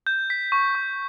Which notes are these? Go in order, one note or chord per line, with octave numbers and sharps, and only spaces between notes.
G6
B6
C#6
C#6